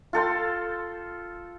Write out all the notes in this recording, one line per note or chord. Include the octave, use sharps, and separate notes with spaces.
F4 A4 G5 C6